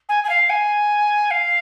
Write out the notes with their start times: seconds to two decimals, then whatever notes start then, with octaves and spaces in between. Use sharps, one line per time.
0.09 G#5
0.24 G#5
0.29 F5
0.50 G#5
1.31 F5